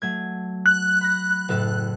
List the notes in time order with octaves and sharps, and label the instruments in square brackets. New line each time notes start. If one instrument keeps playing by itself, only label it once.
[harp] F#3 A3 G#6
[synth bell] F#6
[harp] B5 A#6
F#1 A2 A4